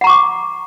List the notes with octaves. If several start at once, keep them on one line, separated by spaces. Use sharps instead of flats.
F#5 A#5 C#6 D6